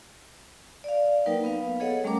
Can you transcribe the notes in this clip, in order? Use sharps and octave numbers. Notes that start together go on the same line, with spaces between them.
D5 F5
F#3 A#3 D#4 A#4 B4 G5
B3 B4 F5
G#4 A4 C#5 D#5 F#5
G3 A3 C#4 A#4 A#5 D6